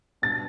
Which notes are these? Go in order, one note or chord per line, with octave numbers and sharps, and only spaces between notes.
B2 G3 D4 A6